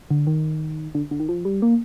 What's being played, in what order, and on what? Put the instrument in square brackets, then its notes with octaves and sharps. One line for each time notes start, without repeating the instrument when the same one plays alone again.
[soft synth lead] D3
D#3
D3
D3
D#3
F3
G3
A#3